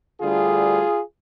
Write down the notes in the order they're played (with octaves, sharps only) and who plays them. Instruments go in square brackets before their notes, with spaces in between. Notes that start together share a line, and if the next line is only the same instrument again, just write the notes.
[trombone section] D2 D3 G3 F4 G#4